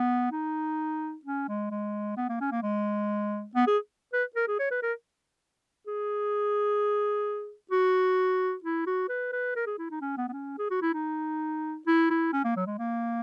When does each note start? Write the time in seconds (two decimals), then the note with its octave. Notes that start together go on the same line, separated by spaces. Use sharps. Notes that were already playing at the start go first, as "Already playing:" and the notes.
Already playing: B3
0.32 D#4
1.25 C#4
1.48 G#3
1.71 G#3
2.17 B3
2.29 A#3
2.41 C#4
2.52 A#3
2.63 G#3
3.55 B3
3.67 G#4
4.13 B4
4.36 A#4
4.48 G#4
4.59 C#5
4.71 B4
4.82 A#4
5.87 G#4
7.71 F#4
8.64 E4
8.86 F#4
9.09 B4
9.32 B4
9.56 A#4
9.67 G#4
9.78 E4
9.91 D#4
10.01 C#4
10.17 B3
10.28 B3
10.33 C#4
10.58 G#4
10.71 F#4
10.82 E4
10.94 D#4
11.87 E4
12.10 E4
12.33 C#4
12.45 A#3
12.56 F#3
12.67 G#3
12.79 A#3